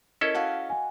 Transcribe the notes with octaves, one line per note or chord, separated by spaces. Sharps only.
C#4 E4 A4 A#4 D#5
F#4 D#5 F5 A5
G#5